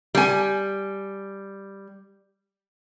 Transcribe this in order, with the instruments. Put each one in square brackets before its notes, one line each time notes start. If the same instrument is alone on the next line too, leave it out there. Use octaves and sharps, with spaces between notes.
[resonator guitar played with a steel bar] G3 G#5